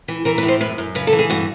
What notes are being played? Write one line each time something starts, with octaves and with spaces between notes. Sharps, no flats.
E3
E3 A#4
B4
A2
C5
F#2 B4
F#2
C#3 B4
A4
E3
G#4
G2 F#4